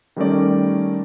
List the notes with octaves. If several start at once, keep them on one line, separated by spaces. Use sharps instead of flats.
D#3 G3 A3 C#4 A#4 D5